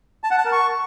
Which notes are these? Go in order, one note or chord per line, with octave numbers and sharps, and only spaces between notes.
A5
F#5
A5
A#4
C#6